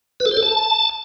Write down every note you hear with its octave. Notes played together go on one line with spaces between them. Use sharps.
B4
A4
C5
A4
A5